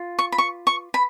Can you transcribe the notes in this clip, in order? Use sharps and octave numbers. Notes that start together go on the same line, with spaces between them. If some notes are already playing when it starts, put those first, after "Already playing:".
Already playing: F4
C#6
B5
C#6
C#6
B5